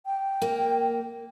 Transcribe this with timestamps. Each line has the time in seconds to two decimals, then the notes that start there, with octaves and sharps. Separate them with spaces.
0.06 G5
0.42 A#3